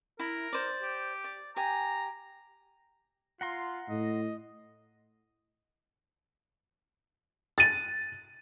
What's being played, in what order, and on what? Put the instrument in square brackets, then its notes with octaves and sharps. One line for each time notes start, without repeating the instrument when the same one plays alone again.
[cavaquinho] E4 [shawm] A#4
[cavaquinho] C5 D5
[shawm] G4
[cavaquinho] D5
[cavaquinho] G4 G#5 [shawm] A#5
[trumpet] F4 [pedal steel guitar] F#5 A#5 C6
[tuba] A2 [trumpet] D#5
[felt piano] A6 D#7